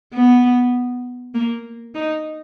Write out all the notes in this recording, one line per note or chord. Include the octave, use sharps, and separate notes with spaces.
B3
A#3
D#4